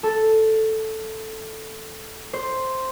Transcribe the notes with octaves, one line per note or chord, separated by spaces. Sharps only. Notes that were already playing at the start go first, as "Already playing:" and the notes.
A4
C5